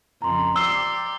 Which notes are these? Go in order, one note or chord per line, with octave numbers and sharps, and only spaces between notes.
F2 C#3 A#5 C6
G4 D5 E6 C7 G7